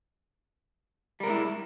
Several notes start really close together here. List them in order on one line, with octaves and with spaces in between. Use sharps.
G3 A#4 G#3 E4